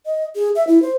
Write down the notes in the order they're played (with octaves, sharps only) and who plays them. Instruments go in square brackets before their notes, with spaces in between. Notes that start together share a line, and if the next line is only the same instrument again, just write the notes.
[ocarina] D#5
G#4
E5
E4
C5